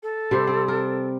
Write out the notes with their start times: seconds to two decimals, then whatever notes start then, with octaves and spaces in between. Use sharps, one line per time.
0.02 A4
0.31 C3 G3 C5
0.47 C4
0.68 A#4